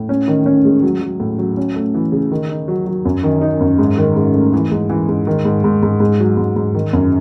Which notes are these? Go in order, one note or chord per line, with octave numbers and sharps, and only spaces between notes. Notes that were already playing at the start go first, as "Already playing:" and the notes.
Already playing: A2
C#4
D#3
C#4
G#3
F#3
F#3
A2
F#3
C#4
A3
E3
C#3
D#3
D#4
F#3
F#3
F#2
D#3
D#4
F#2
G#2
D#3
G#2
A3
E3
G#2
E3
G#2
D#3
G#2
G#2
G#2
G#2
F#3
G#2
G#2
D#3
F#2